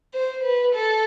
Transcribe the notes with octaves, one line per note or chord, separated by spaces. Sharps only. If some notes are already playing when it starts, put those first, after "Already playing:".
C5
B4
A4